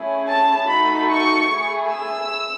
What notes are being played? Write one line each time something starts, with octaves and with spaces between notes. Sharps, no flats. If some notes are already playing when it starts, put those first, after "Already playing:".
Already playing: A3 C#4 E4 G#4
A5
A3 D#4 F#4 A4 B5
C#6
A3 E4 G#4
E6